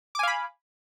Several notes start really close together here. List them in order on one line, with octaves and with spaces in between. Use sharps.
D6 G#5 F5 B5